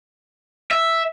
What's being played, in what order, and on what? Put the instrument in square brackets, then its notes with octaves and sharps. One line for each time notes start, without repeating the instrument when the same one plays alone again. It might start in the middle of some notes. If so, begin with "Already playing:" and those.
[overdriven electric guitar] E5